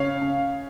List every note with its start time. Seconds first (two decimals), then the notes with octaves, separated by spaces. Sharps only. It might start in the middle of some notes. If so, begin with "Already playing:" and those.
Already playing: C#3 C#5 F5
0.21 C#3